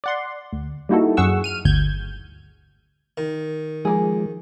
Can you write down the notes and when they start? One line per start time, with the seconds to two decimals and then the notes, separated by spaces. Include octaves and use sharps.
0.04 D5 F#5 C6
0.53 D2
0.89 G3 A#3 D#4 E4 F#4 A4
1.17 F#2 F#3 G#4 F#5 C#6 E6
1.44 F6 D#7
1.65 G1 D2 G6 G#6
3.18 D#3
3.85 F3 G#3 A#3 G#4